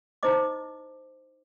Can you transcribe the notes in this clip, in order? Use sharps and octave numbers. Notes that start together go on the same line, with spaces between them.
D#4 E4 C5 D#5 D6